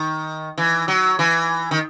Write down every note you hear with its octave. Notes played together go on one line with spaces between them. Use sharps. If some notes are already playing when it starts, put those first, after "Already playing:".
Already playing: D#3
E3
F#3
E3
D#3